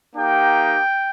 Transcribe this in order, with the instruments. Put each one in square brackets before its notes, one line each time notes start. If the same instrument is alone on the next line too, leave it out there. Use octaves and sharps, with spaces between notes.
[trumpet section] A#3 D#4 G4 G5